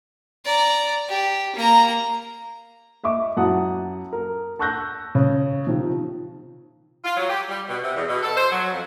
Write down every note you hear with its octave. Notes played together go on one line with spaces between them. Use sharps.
D5 A#5
G4
A#3 A#5
D#5 E5 C#6 D6
F#2 E4 F#5 A5 D#6
A#4
A5 C#6 E6 F#6 G6 A#6
C#3
C3 D#3 F3
F4
F#3
G4
G3
B2
C3
E2
B2
A4
C5
F#3
F2